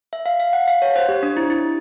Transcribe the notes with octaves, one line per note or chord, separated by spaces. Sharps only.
E5
F5
F5
F#5
F5
C#5
C5
G4
D4
E4
E4